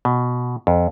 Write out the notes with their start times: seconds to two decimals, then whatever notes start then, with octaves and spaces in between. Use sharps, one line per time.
0.05 B2
0.67 F2